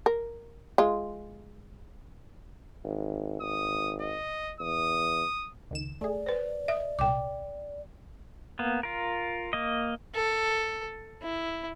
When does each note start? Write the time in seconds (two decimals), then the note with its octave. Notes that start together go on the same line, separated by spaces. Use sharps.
0.06 A#4
0.78 G#3 F4
2.84 G#1
3.41 G#1 D#6
4.01 D#5
4.60 E2 D#6
5.71 C#2 D#3 E7
6.01 A3 G#4 D5
6.26 B4 C5
6.68 D#5 E5
6.99 C2 A#2 G5 D6
8.59 A#3 B3
8.83 F4 A#4
9.53 A#3 D#5
10.15 A4
11.23 E4